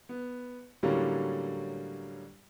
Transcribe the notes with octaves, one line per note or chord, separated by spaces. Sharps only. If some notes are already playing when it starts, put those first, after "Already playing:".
B3
A2 D3 F#3 G3 A#3 C#4